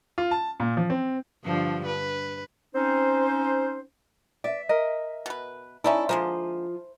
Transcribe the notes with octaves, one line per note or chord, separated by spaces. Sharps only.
F4
A5
A#2
F3
C4
G2 D3 F3
B4
C4 C#4 D#4 C5
D5 E5
A#4 D#5
B2 B4
C#4 D#4 E4 A4 D5 E5
D3 F3 G#3 A#3 C5